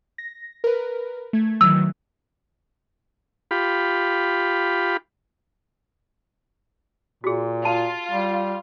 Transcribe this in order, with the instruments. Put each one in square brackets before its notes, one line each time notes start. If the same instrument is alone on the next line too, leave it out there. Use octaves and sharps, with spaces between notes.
[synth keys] A#6
A#4 B4
A3 G#6
[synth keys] D#3 E3 F#3 [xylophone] E6
[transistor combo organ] F4 G4 B5
[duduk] A#2 [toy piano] F#4 G#4
[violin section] F4 [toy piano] A5
[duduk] G3